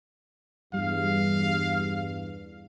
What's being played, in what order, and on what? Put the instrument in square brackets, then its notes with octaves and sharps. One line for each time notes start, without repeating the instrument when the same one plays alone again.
[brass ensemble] E2 G2 [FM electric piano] G3 [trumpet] F5